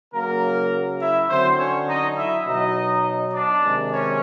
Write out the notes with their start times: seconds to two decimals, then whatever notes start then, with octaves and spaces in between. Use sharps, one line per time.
0.13 C#3 F#3 A#3 A#4
1.01 E4 E5
1.29 D3 F#3 C4 C5
1.59 C#4 C#5
1.88 D#4 D#5
2.17 E4 E5
2.46 B2 F#3 D#4 D#5
3.34 D4 D5
3.63 C3 D#3 G#3
3.92 C#4 C#5